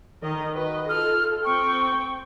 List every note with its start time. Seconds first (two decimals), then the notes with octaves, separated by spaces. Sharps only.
0.23 D#3 A#4 D#5
0.54 F#4 B4 D#5
0.89 F4 A4 F6
1.45 C4 G5 C#6